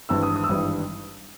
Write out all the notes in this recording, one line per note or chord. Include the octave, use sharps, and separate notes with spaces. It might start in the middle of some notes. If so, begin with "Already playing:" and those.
G#1 G2 E3 G3 E6
D#6
D#6
E6
G#1 G2 E3 G3 D#6